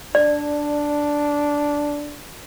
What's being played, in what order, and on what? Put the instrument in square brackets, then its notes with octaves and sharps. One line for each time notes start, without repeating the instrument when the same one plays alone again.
[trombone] D4 [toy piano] D5